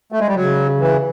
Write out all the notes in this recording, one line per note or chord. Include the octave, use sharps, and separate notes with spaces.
A3
G#3
G3
C#3 F#3
E3